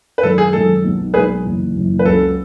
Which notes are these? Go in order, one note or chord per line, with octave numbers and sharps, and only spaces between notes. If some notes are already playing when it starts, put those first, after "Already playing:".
B4
F#2 D#3 G#3 A4
G#4
F#2 D#3 G#3 A4
B1 B2 G#3 D#4
B1 B2 G#3 D#4 G#4 B4
F#1 F#2 E3
F#1 F#2 E3
B4
C#2 C#3 F#3 C#4 G#4 A4